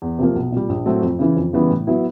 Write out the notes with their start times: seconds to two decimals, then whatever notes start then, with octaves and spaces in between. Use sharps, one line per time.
0.02 E2
0.19 C3 F3 A#3
0.36 B1
0.52 A#2 G3
0.69 A#1
0.86 A2 F#3 A3 C4
1.02 F2
1.19 C#3 E3
1.37 F2
1.53 C#3 E3 G3 B3
1.70 A2
1.87 F#3 B3 E4